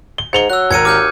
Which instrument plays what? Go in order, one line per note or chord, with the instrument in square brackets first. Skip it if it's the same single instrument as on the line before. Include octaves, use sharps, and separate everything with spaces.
[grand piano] G7
[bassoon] G#2 [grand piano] C#7 F7 G7
[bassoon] F#3 [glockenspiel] E6 F#6
[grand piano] G#1 A#4 [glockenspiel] G#6 C#7 D#7
[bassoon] D#2 [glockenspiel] D6 F6 G6